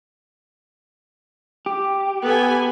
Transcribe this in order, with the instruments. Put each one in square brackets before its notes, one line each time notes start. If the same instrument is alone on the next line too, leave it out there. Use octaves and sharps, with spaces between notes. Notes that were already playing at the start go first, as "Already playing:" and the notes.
[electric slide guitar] G4
[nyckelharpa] B3 [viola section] A4 B4 G#5